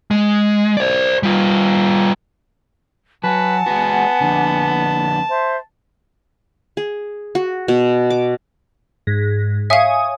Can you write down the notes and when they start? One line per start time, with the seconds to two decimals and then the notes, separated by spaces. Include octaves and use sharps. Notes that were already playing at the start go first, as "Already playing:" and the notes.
0.11 G#3
0.77 C5 D5
1.23 G3 F4
3.24 F#3 B4 F#5 G#5 A5
3.66 G#3 B3 F#4
4.21 F2 D3
5.30 C5 E5 C6
6.77 G#4
7.35 F#4
7.68 B2
8.10 D6
9.07 G#2
9.70 C#5 E5 F5 G#5 D#6